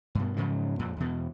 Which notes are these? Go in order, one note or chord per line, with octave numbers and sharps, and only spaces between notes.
G2 B2
G#2 C#3 F3 F#3
F2 A#2
E2 B2